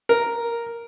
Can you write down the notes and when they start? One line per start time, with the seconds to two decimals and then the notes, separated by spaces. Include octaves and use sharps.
0.09 A#4